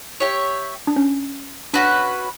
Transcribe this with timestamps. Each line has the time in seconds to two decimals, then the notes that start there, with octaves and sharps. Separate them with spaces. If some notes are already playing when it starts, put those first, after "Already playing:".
0.20 G4 C#5 E5
0.87 D4
0.96 C#4
1.73 C#4 D4 F#4 B4